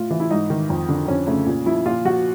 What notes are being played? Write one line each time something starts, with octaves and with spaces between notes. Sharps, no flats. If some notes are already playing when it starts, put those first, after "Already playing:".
Already playing: A2 F4
E3
E4
G#2 D#4
D#3
F2
D3
F2 C#4
C#3 A3
A#2
F3 E4
A#2 F4
F3 F#4